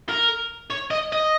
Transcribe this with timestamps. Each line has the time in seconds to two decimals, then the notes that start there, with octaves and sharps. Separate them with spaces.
0.09 A#4
0.70 C#5
0.91 D#5
1.12 D#5